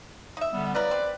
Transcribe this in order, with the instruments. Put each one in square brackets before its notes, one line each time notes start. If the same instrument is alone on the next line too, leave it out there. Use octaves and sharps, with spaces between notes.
[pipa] D#4 E5
[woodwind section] D3 G3 B3
[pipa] C#3 E4 A#4 [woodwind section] B4 D5
[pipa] C4